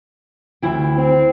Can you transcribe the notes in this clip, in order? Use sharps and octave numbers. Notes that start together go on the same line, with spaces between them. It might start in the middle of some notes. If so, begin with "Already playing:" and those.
D2 E4 G5
C4